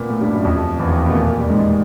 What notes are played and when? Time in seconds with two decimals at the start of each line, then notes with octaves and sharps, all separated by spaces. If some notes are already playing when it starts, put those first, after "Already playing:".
Already playing: A#2 A#3 B3
0.09 A2 A3
0.21 G2 G3
0.33 F#2 F#3
0.44 F2 F3
0.79 E2 E3
0.88 D#2 D#3
1.06 B2 B3
1.10 A3
1.14 A#2 A#3
1.38 G3
1.50 G#2 G#3